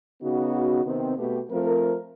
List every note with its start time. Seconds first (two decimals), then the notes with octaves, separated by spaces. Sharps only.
0.22 C#3 B3 D#4 F#4
0.86 C3 D#3 B3 C4
1.18 B2 A3 G4
1.51 F3 A3 C4 A#4